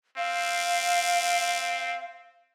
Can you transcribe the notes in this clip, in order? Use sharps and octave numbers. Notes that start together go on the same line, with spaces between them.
C4 F5